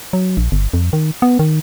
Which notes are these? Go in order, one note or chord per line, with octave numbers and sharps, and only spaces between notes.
F#3
A#1
G1
F2
D#3
B3
D#3